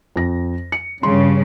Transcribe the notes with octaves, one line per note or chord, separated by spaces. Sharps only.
F2 A#6
C#7
G2 C#3 C6